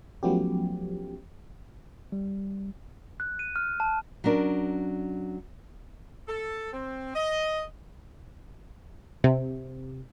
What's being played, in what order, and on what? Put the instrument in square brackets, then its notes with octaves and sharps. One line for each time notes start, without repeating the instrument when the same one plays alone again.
[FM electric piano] F3 F#3 A3 B3 C#4 G4
[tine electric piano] G3
[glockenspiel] F#6
D#7
F6
A5
[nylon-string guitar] F#3 C#4 D4 A#4
[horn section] A4
C4
D#5
[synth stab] C3